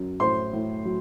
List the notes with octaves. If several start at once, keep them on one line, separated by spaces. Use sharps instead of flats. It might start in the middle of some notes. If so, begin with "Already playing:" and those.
Already playing: F#2 F#3
A2 C5 C6
A2
F#3